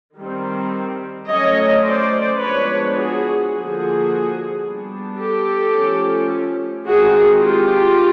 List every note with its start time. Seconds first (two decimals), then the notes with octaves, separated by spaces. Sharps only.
0.17 D#3 G3 C4
1.28 F#3 A3 C#4 C#5 D#5
1.84 C5 D5
2.40 F3 G#3 B3 D4 B4 C#5
2.96 F#4 G#4
3.51 D3 F3 A#3 F#4 G#4
4.63 G3 B3 D4
5.19 G4 A4
5.75 F3 A3 C#4
6.86 D#3 G#3 C4 F#4 G#4
7.42 F4 G4